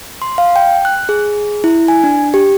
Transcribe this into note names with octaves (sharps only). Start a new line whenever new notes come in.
C6
F5
G5
F#6
G#4
E4
G#5
D4
G4